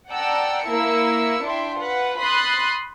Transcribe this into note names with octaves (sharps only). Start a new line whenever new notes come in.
D5 F#5 G5 A5 A#5 E6
A#3 E4 A#4 E6 C#7
D4 E4 E5 G5 C6
F4 B4 F#5
B5 C6 D#6 F#6 A6 C7